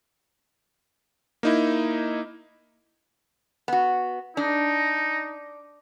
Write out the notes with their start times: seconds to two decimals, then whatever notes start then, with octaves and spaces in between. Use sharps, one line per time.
1.43 A#3 D#4 E4
3.68 B3 F#4
4.37 D4 D#4